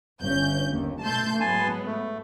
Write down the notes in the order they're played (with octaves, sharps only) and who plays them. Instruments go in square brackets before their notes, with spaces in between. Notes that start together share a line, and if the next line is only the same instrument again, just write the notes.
[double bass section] G1 C#4 [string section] G6
[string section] D#2
[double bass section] B2 A3 [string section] A5 C6 G6
[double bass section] G#2 [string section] F#3 B3 [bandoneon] G#5 A5 C6
[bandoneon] A3